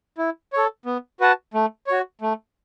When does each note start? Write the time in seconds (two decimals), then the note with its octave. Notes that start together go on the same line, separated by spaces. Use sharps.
0.18 E4
0.53 A4 C#5
0.86 B3
1.20 F#4 B4 F#5 A5
1.54 A3
1.87 F#4 C#5
2.21 A3